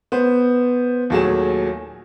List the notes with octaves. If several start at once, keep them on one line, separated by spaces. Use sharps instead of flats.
B3 C5
D#2 A#2 F#3 A3 G#4 E7